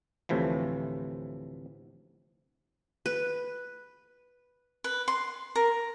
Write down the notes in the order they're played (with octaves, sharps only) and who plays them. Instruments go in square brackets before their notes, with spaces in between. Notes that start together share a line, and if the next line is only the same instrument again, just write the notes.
[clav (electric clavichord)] D2 A2 C3 E3 F3
[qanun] B4
[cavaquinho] B4
C6
A#4